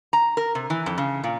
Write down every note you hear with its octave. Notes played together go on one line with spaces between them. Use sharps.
A#5
A#4
C3
E3
F2
C#3
A#2